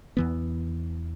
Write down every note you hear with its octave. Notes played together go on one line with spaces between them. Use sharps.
E2 E3 B3